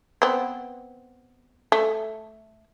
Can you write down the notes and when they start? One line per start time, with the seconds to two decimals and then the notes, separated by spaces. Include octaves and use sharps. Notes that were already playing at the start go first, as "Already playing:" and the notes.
0.22 B3 C4
1.72 A3